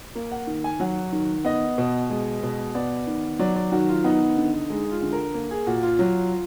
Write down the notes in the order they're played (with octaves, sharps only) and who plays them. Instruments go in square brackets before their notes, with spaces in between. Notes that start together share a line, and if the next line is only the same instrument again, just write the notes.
[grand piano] A#3
F#5
D#3
G#5
F#3 F#5
D#3
B3 D#5
B2
G#3
B2
B3 D5
D#3
F#3 D5
D5
D#3 F#4
F4
B3 D#4
D3
G#3 D#4
F4
D3
A#4
A#3
G#4
A#2 F#4
F4
F#3